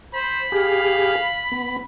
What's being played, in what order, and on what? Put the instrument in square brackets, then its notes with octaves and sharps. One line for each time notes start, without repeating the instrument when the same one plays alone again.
[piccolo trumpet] C5 [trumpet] B5
[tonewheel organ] G4 G#4 [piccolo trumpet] F5
[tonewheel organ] B3